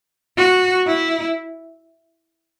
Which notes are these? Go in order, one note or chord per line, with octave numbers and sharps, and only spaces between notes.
F#4
E4